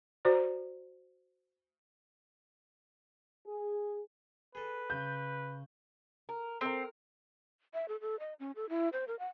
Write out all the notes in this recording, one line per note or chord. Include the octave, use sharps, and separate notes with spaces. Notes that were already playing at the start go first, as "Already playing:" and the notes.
F#4 C5 D5 A#5
G#4
G#4 A4 B4
C#3 G6
A#4
C4 A4 A#4
E5
A4
A4
D#5
C#4
A4
E4
C5
A#4
F#5